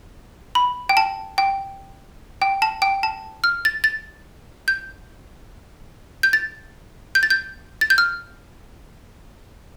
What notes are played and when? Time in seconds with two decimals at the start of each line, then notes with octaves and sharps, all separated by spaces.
0.55 B5
0.89 G5
0.97 A5
1.38 G5
2.42 G5
2.62 A5
2.82 G5
3.03 A5
3.44 F6
3.65 A6
3.84 A6
4.68 G6
6.23 G6
6.33 A6
7.15 G6
7.23 A6
7.30 G6
7.81 A6
7.90 G6
7.98 F6